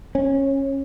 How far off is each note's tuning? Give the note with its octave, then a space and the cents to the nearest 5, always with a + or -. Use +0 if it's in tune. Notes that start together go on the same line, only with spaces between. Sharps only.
C#4 -20